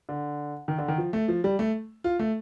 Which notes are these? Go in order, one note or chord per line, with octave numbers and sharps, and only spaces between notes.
D3
D#3
D3
D#3
F3
A3
F3
G3
A3
F4
A3